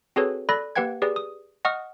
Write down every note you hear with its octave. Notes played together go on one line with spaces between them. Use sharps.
C4 F#4 G#4 A4 B4 C#5
A4 D5 B5 F#6 A#6
A#3 G4 B4 F#5 G5 G#6
G4 G#4 B4 D5
D#6
D#5 F#5 C#6 D#6 F6